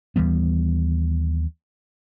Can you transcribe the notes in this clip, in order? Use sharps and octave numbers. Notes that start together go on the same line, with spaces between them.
D#2 E3 G3 B3